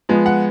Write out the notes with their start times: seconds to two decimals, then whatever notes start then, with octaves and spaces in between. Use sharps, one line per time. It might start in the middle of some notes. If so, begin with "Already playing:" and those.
0.09 F3 G#3 B3
0.26 F#5